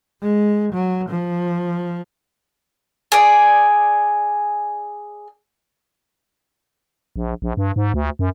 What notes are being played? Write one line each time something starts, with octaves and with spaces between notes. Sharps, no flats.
G#3
F#3
F3
G#4 D5
A#1
A#1
G2
G#2
D2
F#2